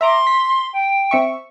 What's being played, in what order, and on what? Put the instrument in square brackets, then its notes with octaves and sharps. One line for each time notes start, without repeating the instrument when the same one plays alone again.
[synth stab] E5 A#5 D6 [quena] C6
[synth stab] B6
[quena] G5
[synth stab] C4 E5 C#6